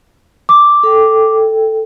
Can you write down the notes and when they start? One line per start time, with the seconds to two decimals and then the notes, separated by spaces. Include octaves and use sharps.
0.49 D6
0.83 A4 G5